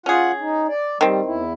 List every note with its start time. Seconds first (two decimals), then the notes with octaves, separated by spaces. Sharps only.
0.06 C#4 F4 G#4 F#5
0.40 D#4
0.68 D5
1.01 D#3 G3 C4
1.25 E2 E4